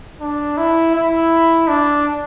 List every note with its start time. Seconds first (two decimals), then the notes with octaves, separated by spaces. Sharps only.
0.21 D4
0.57 E4
0.95 E4
1.68 D4